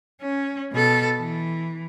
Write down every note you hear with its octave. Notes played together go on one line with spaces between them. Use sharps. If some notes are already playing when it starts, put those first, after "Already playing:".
C#4
B2 A4
E3